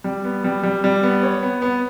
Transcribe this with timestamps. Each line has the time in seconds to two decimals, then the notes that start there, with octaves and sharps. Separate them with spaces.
0.04 G3
0.24 B3
0.44 G3
0.63 G3
0.84 G3
1.03 B3
1.23 C#5
1.43 B3
1.62 B3